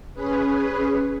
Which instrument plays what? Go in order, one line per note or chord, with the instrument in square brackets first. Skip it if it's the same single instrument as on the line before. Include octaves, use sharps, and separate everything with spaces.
[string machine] C#4 G#4 B4